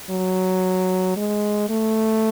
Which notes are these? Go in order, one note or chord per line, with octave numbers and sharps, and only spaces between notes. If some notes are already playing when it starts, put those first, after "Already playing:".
F#3
G#3
A3